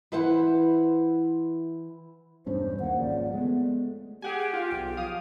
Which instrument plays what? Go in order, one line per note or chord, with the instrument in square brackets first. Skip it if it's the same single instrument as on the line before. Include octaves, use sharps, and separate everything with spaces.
[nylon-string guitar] E3 E4 B4 C5 F#5
[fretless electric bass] E1 G2 C#4 [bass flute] C5
[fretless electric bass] D#2 A#3 [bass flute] F#5
[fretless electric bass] G#1 C#3 F3 [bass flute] D5
[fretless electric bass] G#3 A3 [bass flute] B3
[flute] G4 [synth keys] G#4 F#5 G#5
[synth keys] F4
[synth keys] B1 [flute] G5
[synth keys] F3 F5 D#6